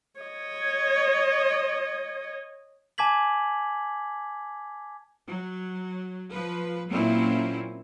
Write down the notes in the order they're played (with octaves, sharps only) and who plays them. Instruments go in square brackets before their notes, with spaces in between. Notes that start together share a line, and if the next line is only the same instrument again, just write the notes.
[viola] C#5 D#5
[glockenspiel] G#5 A5 D6 G#6 B6 F#7
[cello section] F#3
F3 B4
A#2 F#3 C4 C#4 E4